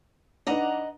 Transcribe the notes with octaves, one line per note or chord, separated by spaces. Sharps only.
D4 D#4 B4 D#5 F#5 A#5